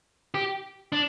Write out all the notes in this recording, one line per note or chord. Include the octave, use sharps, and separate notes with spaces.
G4
D4